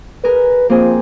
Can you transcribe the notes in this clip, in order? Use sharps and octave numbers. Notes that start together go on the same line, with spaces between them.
G#4 A#4 B4
F3 A#3 C4 G#4